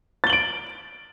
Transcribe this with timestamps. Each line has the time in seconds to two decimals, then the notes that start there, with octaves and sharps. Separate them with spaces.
0.24 A6
0.27 G7
0.30 F#7
0.33 D7